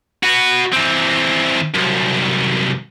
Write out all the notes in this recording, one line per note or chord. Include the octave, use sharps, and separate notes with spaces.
F#4 B4
E3 C4
C2 F#2